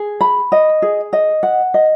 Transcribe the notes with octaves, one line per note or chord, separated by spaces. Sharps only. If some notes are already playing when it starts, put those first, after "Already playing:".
Already playing: G#4
B5
D#5
G#4
D#5
F#5
D#5